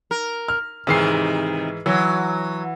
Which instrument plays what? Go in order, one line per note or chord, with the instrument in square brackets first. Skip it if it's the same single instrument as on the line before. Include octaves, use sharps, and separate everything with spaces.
[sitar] A#4
[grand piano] F6
[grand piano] G#2 E3 C7 [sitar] C3 D#3
[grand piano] E3 [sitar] F#3